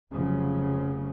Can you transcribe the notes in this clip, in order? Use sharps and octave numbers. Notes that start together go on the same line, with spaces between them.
F1 C#3 F3 F#3